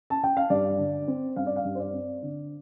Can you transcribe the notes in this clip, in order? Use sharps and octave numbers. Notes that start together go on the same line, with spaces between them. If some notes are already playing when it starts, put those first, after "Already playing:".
A5
G5
F5
G2 D5
D3
C4
G2 F5
D5
F5
G2
C5
D5
C4
D3